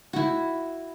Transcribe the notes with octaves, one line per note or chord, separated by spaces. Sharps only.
E4 F#4